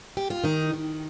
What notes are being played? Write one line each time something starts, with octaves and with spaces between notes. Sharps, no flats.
G4
F4
D#3 D#4
D#3